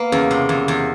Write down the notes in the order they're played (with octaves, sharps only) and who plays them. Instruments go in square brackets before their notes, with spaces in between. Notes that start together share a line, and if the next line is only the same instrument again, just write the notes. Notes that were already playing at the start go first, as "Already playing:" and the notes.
Already playing: [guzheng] A#3 B3
[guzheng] E2 [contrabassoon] C#3
[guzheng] C3
E2
E2